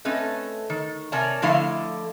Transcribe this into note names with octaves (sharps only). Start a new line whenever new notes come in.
A3 C4 C#4 B4 D#5
D#3
C3 A#4 C#5 D5 G#5 A5
D3 F3 A3 E4 D#5 F5